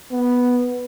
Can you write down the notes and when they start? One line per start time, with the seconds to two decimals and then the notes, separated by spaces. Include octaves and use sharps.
0.12 B3